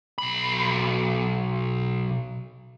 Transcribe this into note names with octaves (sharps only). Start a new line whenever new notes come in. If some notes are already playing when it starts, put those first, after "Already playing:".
B1 B5